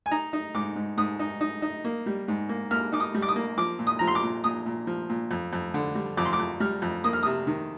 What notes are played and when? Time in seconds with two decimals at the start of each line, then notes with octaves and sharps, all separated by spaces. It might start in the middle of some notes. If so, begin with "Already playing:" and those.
0.06 G#5
0.11 D#4 A#5
0.33 D#4
0.55 G#2 D6
0.76 G#2
0.97 G#2 D#6
1.19 D#4
1.41 D#4
1.62 D#4
1.85 A#3
2.06 G3
2.28 G#2
2.49 A#3
2.71 A#3 F6
2.92 D#4 D6
3.00 D#6
3.14 G3
3.22 D6
3.28 D#6
3.36 A#3
3.57 F3 D6
3.79 A#2
3.87 D#6
3.99 F3 A#5
4.07 C6
4.15 D6
4.22 A#2
4.44 A#2 D#6
4.66 A#2
4.87 F3
5.09 A#2
5.31 F2
5.53 F2
5.74 D3
5.95 G3
6.17 F2 D6
6.25 C6
6.33 D6
6.39 F2
6.60 G3 F6
6.82 F2
7.04 A#3 D#6
7.13 F6
7.23 C3 D#6
7.47 D#3